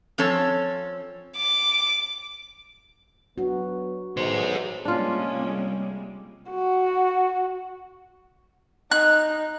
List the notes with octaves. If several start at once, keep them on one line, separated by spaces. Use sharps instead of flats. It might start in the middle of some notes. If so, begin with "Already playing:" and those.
F3 C4 C#4 A4 C#5
D6
F#3 B3 D4 F#4
B1 D#3 E3 G#4 C5
C3 G3 G#3 A#3 C#4 D4 F4
F#4
D#4 F#6